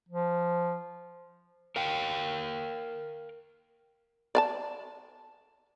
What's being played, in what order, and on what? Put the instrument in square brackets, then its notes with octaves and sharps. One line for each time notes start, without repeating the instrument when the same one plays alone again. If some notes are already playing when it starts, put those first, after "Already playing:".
[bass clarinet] F3
[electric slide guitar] A#4 F5 G5
[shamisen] D5 F5 A5